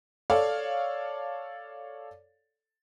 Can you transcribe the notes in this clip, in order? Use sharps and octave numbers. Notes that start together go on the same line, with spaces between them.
A4 C#5 D5 F5